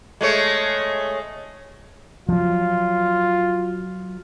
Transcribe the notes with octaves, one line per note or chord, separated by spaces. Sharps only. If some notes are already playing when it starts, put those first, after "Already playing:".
G#3 A3 C#5
F3 F#3 F4